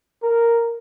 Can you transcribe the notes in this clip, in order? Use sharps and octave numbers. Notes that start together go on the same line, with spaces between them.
A#4